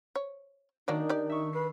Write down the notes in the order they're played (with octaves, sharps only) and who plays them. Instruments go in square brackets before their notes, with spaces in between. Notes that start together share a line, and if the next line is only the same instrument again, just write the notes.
[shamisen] C#5
[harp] D#3 D4 [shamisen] F#3 A#3 D5 [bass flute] D#4
[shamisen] G4 D5
[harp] E5 C#6
[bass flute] B4 [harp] C7